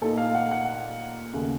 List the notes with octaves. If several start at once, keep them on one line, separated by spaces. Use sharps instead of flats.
A#2 A3 D#4 A4
F5
F#5
F#5
D#2 C#3 A3